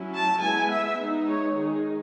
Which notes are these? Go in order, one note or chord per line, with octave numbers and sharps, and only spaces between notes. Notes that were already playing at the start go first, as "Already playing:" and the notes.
Already playing: F#3 C#4 E4
A5
G#3 B3 E4 G#5
E5
G#3 B3 D#4
C#5
D#3 G#3 D#4 G#4